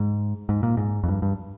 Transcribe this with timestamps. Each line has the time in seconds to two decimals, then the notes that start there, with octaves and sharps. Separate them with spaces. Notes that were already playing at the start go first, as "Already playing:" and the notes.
Already playing: G#2
0.49 G#2
0.63 A#2
0.77 G#2
1.04 F2
1.08 G2
1.22 G2